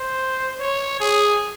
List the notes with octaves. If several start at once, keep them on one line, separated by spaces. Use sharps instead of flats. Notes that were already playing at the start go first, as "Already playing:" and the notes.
Already playing: C5
C#5
G#4